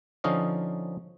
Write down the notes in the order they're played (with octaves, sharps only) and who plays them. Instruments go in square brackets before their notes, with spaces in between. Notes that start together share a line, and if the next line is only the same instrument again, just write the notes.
[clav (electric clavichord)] D3 F3 C#4 D#4 D#5 F5